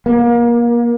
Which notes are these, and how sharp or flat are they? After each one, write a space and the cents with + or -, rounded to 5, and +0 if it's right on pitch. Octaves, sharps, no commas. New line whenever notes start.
A#3 +30